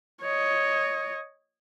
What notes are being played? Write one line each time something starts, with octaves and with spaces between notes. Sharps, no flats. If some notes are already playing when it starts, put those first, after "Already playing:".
C#5 D#5